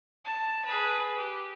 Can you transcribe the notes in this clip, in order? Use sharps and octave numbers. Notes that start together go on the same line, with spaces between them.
A5
G#4 B4
G4